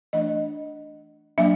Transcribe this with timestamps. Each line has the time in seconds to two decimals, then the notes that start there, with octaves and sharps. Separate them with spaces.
0.13 E3 A3 D4 D#5
1.38 F#3 A#3 D4 E5